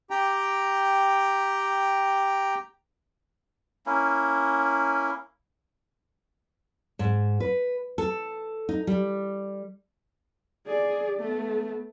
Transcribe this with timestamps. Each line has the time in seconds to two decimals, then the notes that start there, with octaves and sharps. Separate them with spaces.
0.11 G4 G5 A#5
3.86 A#3 C#4 E4
6.99 G#2
7.40 B4
7.98 A4
8.69 D#4
8.87 G3
10.67 G#4 D5
11.19 A3 B3